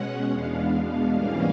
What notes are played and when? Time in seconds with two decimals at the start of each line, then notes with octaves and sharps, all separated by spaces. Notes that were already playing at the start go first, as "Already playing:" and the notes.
Already playing: B2 G#3 C#4 F#5
0.29 E2 B2 G#3 B3 D4 F5
1.10 G#2 E3 G3 A#3 C#4